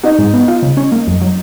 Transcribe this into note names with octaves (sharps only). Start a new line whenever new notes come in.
D#4 F#4
G#2
B3
F4
C#3
C#4
A#3
F#2
F#3